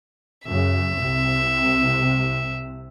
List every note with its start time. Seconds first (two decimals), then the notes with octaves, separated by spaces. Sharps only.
0.46 F#2 C#3 E5
0.96 C2 C3